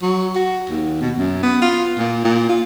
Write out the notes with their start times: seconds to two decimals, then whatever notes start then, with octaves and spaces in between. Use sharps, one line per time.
0.02 F#3
0.35 F#4
0.69 D#2
1.01 B2
1.18 F#2
1.43 B3
1.62 F4
1.98 A#2
2.24 A#2
2.49 F4